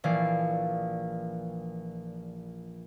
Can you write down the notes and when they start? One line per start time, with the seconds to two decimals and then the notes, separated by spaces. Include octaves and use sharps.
0.04 A#1 E3 D5 F5